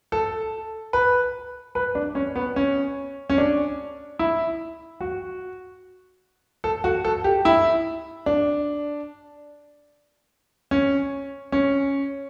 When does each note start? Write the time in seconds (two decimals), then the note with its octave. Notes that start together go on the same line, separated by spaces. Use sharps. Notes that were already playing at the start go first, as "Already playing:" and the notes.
0.12 A4
0.93 B4
1.75 B4
1.95 D4
2.15 C#4
2.36 B3
2.56 C#4
3.30 C#4
3.38 D4
4.19 E4
5.01 F#4
6.64 A4
6.84 F#4
7.05 A4
7.24 G4
7.45 E4
8.26 D4
10.71 C#4
11.52 C#4